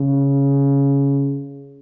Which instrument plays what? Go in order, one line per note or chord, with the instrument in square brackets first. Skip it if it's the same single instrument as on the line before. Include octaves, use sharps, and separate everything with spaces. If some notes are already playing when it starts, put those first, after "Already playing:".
Already playing: [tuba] C#3